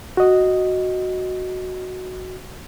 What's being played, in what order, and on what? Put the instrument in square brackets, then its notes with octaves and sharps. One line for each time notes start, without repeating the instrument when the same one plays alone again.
[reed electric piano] F#4 D#5